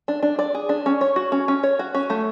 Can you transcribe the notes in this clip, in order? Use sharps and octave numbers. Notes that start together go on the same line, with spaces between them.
D4
D4
D5
G#4
D4
C#4
C#5
F#4
C#4
C#4
C#5
F#4
C#4
A3